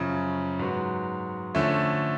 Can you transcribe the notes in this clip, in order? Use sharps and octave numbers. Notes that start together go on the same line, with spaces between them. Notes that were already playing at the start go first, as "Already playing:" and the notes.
Already playing: F#2 C#3 F3
G#2 F#3 B3 F#4
D3 F3 A3 C#4